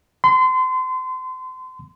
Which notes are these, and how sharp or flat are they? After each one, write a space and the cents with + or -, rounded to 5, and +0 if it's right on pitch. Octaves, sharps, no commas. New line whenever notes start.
C6 -30